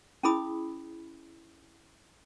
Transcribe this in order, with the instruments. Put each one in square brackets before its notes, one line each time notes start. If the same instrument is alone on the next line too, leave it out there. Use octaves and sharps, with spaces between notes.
[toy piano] C#4 E4 G#4 B5 D#6